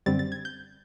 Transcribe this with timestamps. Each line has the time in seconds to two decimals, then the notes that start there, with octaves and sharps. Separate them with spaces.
0.06 F#2 D3 G3 C4 A6
0.19 A6
0.32 G#6
0.45 G6